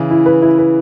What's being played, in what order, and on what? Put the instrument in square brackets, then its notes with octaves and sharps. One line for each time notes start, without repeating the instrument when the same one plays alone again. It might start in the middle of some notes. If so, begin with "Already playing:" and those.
Already playing: [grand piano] C#3 E3
[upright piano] E4
B4
E4
B4